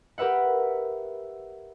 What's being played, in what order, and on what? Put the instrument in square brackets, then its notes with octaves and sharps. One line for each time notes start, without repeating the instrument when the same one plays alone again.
[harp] G4 A#4 B4 E5 F#5